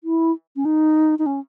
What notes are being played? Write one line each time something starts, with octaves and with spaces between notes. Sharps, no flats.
E4
C#4
D#4
D#4
C#4